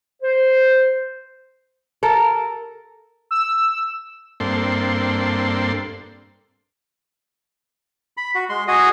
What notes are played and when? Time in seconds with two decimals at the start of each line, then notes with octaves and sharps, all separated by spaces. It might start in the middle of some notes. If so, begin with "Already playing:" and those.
0.21 C5
2.03 A4 A#4
3.31 E6
4.40 G2 A#3 C4 D4 A4 C6
8.17 B5
8.35 F#4
8.49 G#3 C6
8.68 F#4 G#4 D#5